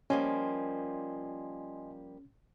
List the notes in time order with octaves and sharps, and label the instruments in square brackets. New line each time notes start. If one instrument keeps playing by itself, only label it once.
[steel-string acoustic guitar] F3 G3 A#3 [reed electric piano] C#4 [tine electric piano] D#5 G#5 C6